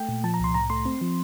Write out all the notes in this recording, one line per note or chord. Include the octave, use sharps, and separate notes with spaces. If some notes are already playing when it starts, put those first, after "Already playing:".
Already playing: A3 G5
A#2
F3 A5
A#5
C2 C6
A2 A#5
A3 C6
C4
F3